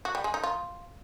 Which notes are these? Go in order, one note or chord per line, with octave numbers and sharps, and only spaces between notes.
F#4
G3
G#3
D#4
F4